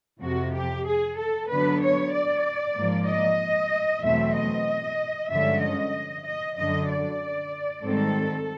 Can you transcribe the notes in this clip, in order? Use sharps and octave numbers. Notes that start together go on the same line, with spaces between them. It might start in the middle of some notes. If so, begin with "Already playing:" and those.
F2 C3 F3 F#4
G4
G#4
A4
D3 F#3 B3 D4 B4
C#5
D5
G#2 F3 A#3
D#5
E2 B2 F#3 A3 C4 E5
D#5
G2 D3 F3 G#3 C#4 E5
D#5
D#5
F#2 D3 F#3 D#5
D5
G#2 D#3 G3 C4 A4